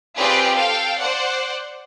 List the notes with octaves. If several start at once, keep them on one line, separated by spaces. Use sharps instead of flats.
C4 F4 G4 G#4 B4 D5
A4 F5 G5
C5 D5 F#5